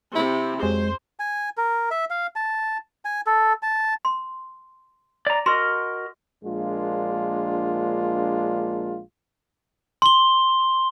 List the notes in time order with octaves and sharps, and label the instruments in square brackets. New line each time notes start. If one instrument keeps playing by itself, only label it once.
[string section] C3 [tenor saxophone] E4
[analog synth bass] F2 [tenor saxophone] F#3 [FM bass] G#3 [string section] C5
[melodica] G#5
A#4
E5
F5
A5
G#5
A4
A5
[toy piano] C6
[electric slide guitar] D5 A#5
[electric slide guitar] F#4 A#4 D#5 [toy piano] C6
[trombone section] A#1 G#3 A#3 D4 F4
[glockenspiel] C6 G7